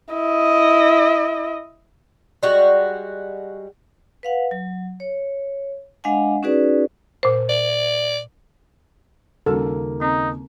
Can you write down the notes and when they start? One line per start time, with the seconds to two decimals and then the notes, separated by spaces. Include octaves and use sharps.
0.14 E4 D#5
2.43 G3 G#3 F#4
4.23 B4 F5 F#5
4.51 F#3
5.00 C#5
6.04 G#3 D4 D#5 F5 F#5 G#5
6.43 C#4 D#4 F#4 G#4 B4 D5
7.23 A#2 C5
7.49 D5
9.46 D#2 C#3 G3 A#3 C#4 F#4 A4
10.01 C4 D#4